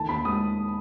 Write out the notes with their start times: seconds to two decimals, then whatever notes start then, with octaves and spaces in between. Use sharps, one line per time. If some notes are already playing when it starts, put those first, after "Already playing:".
Already playing: D#3 A3 A5
0.09 D#2 B5
0.25 G#3 D#6